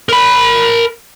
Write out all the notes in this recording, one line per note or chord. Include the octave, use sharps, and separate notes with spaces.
A#4 B5